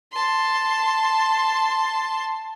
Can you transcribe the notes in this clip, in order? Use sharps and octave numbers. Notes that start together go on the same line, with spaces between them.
A5 C6